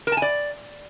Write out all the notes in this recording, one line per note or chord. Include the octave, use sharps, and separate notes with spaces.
A#4
A5
G#5
D5